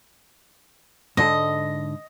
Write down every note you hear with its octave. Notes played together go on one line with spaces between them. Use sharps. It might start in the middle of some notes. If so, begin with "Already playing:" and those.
G#2 D3 A4 D#5